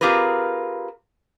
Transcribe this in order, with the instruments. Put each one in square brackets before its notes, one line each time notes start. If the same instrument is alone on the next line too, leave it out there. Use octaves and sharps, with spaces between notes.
[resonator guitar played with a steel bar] C4 F4 G4 G#4 A#4 B4